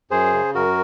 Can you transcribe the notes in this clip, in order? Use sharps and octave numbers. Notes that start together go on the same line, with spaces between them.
F#2 G#4 C5
C#3
F#2 F#4 A#4